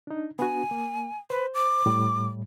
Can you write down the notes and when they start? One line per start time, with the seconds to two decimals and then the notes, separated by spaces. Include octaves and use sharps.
0.07 D4 D#4
0.39 B3 D4 F#4 G#5
0.71 A#3
1.30 B4 C5
1.54 D6
1.86 A2 G3